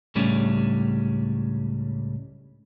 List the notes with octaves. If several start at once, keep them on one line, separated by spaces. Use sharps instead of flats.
C#2 A2 G3 A3 C#4 D4